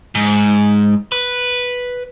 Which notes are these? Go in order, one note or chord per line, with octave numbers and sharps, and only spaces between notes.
G#2
B4